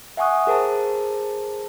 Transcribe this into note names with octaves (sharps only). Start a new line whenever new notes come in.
E5 F#5 G#5 C#6 D#6 F#6
G#4 A#4 C5 A5